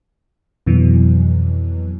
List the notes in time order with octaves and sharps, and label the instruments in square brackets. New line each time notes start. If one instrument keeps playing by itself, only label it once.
[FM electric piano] F2 B2 E3 F#3